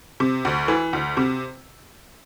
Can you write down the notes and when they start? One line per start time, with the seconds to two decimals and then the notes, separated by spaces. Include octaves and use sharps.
0.20 C3
0.45 D2
0.68 E3
0.93 D2
1.17 C3